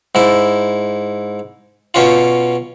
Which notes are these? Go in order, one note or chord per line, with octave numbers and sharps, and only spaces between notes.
G#2 E4
B2 C#4 F4